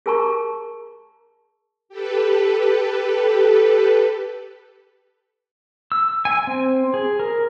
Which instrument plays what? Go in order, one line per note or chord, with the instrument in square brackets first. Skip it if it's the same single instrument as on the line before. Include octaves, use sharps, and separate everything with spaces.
[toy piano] G#4 A#4 A5 A#5 C#6
[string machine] G4 A4 B4
[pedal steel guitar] E6
G#5
C4
G#4
A#4